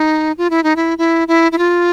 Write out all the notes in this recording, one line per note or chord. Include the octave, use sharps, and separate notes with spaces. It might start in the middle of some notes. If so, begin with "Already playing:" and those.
Already playing: D#4
F4
E4
D#4
E4
E4
E4
E4
F4